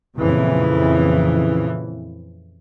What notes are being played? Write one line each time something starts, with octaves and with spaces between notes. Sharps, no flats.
F2 A#2 C#3 E3